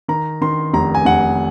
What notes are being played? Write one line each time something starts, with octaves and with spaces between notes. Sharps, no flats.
D#3 A#5
D#3 C6
F1 A#5
G#5
F1 F#5